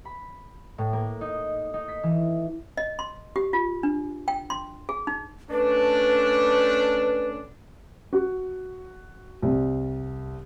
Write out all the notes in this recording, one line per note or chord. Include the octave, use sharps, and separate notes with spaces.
B5
A2
A#3
D#4
D#4
B6
E3
D#5
C6
G4
F4
D4
G5
C6
G#4
D#4
A3 C#4 D4 B4
F#4
C2